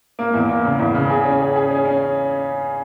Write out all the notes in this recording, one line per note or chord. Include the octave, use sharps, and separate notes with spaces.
A#3
E2
A#3
C#3
E2
C#3
G#4
C#4
G#4
G#4
C#4
C#4